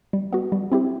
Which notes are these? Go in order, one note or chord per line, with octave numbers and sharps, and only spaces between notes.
G3
B3 F#4
G3
C4 E4 G4